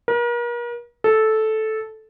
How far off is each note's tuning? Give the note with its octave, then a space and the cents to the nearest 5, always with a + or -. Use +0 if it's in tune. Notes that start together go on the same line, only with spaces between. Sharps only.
A#4 +40
A4 -10